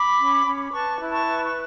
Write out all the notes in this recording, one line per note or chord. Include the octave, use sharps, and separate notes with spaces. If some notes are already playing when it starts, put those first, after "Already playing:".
Already playing: B5 D6
C#4
C#4
B4 A5 C#6
E4
A5 C#6
B4
C#6